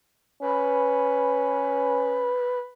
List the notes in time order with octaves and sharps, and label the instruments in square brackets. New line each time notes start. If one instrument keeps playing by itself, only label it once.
[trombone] C#4 [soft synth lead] B4